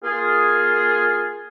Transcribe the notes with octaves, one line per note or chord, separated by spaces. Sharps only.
A#3 F4 G#4